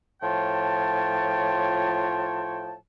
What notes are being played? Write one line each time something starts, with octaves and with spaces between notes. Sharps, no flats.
A2 F3 F4 C#5 G5 A5